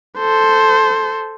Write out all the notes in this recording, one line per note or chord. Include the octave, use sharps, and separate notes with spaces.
A4 C5